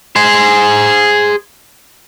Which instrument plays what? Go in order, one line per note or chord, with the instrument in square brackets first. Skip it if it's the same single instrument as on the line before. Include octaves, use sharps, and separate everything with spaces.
[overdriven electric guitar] G#4 C5